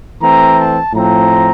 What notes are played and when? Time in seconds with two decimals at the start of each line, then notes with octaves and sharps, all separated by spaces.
0.21 E3 A3 C4 A#5
0.58 A5
0.93 A2 F3 C4 A#5